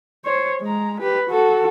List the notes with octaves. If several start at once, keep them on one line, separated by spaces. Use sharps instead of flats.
C5 C#5
G#3 A#5
G4 B4
F#4 A4